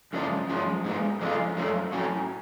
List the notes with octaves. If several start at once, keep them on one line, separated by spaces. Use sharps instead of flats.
F#2 C#3 F3 G#3 D4
F#2 F3 G#3
G#2 G#3 B3
F2 D3 G#3 C#4 F4
F#2 F3 A3
A2 F#3 C#4